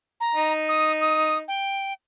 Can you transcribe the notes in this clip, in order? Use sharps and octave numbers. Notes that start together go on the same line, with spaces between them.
A#5
D#4
D#6
D#6
G5